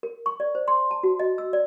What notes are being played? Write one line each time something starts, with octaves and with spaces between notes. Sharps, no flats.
A#4
C#6
D5
C5
C6
A5
F#4
D#5
E6
D5